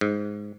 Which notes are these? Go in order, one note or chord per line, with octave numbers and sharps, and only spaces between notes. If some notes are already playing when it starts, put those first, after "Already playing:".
G#2